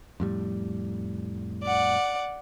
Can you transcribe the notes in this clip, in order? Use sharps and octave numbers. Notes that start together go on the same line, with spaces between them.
F2 A2 G3
D5 F#5